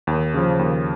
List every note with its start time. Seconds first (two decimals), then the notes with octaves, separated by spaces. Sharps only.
0.07 D#2
0.34 C#3 F3
0.59 D#2